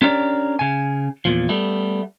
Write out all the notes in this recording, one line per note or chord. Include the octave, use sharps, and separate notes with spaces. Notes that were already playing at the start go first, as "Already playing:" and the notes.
C#4 D4 G4 A#4 C#5 D5
C#3 G#5
E2 A#2 F3
G3 A3 B3